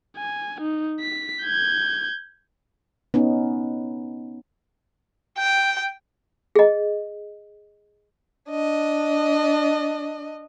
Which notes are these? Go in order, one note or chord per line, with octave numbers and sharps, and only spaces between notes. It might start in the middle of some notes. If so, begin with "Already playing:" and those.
G#5
D#4
B6
G6 G#6
B3 C#4 D#4
G5
G#4 D#5
D4 D#5